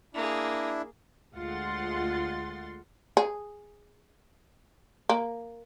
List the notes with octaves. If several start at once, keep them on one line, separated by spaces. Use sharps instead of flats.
A#3 D4 E4 G#4
D2 G#3 F4 F#5 C6 A6
G#4
A#3